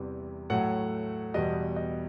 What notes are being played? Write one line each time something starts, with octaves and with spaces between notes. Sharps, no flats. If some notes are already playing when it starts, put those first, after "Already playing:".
Already playing: E2 C3 E3 G3
A2 F#3 A3 F#5
E2 B2 G3 D#5
D#5